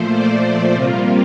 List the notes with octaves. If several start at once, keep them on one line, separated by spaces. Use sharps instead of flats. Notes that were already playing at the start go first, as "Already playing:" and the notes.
Already playing: A#2 F3 A3 C5
D5
C3 G3 A#3 F4